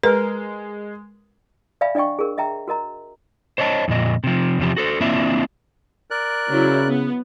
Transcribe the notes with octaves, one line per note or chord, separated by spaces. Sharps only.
G#3 A#4 B4
D5 E5 F5 G#5 B5
D4 D5 D#5 G5 C#6
G#4 A#4
D#5 E5 G5 A#5
F#4 A#4 D#5 A#5
C5 C#5 D#5 G#5 A5
F2 A#2 D#5
C3 F3
E2 C3 F3 G4
F#4 A4 C5
A#3 C4 D4 E4 F4 E5
A#4 D5 F#6
C#3 F#3 E4
B3